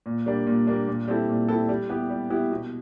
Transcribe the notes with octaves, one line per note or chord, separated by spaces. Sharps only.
A#2
G3 A#3 D4
A#2
G3 A#3 D4
A#2
G3 C4 E4 A4
A#2
G3 C4 E4 A4
G3
B3 E4 G4
G3
B3 E4 G4
B2